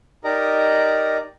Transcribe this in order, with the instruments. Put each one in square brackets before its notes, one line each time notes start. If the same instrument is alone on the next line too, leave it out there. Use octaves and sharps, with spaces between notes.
[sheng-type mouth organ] D#4 G4 A#4 D5 D#5 A#5